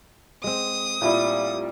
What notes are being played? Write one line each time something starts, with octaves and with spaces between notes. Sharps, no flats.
G#3 C4 D#6
A#2 G3 A3 E4